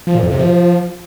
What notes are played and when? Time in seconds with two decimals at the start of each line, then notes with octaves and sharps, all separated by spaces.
0.07 F3
0.15 A#2
0.23 F2
0.31 C3
0.39 F3